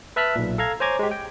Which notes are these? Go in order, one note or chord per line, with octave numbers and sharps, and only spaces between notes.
B4 E5 A5 F6 F#6 B6
B1 A#2
A4 F5 A#5 G#6
C5 C#5 G#5 A#5 D6 G#6
G#3 G4
G5